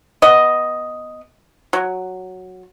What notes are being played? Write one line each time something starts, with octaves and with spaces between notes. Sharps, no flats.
B3 D#5
F#3